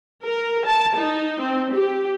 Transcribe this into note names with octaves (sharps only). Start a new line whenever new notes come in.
A#4
A5
D#4
C4
G4